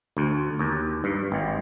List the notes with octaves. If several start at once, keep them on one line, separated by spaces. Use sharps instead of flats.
D2
D#2
G2
G#1